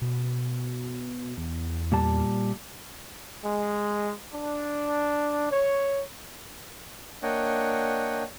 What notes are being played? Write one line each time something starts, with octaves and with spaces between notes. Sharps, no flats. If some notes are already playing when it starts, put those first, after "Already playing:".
B2
E2
A#2 G3 A5
G#3
D4
C#5
A#3 D4 C#5 D#5 F#5 G5